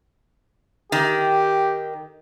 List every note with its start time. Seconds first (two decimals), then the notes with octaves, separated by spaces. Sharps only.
0.92 D#3 G4